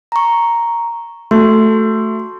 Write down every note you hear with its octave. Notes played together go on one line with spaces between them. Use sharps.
A#5 C#6
A3 F#4 C6